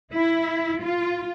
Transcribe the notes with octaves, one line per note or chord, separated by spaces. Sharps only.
E4
F4